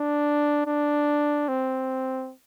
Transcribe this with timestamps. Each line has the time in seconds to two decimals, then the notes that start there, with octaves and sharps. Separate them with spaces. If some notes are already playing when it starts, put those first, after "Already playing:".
Already playing: D4
0.67 D4
1.48 C4